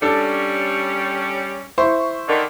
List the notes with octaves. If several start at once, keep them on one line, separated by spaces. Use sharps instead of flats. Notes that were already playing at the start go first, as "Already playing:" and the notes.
G3 C#4 D4 A4
E4 C5 C#6
D3 D#3